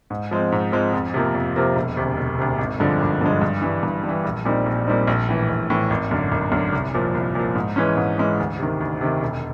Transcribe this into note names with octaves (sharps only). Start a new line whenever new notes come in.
G#2
F3 G#3 C4
G#2
F3 G#3 C4
F2
C3 F3 A#3
F2
C3 F3 A#3
E1
D2 C3
E1
D2 C3
G#1
G2 D3 F3 G#3
G#1
G2 D3 F3 G#3
G2
E3 G3
G2
G3
E3
A#1
A#2 G3 C4 D#4
A#1
A#2 G3 C4 D#4
A#1
A2 E3
A#1
A2 E3
G#1
F#2 D3
G#1
F#2 D3
C2
A#2 F3
C2
A#2 F3
G#2
E3 G#3 C#4
G#2
E3 G#3 C#4
D2
C3 D#3
D2
C3 D#3
E1